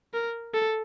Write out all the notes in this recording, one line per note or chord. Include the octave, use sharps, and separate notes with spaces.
A#4
A4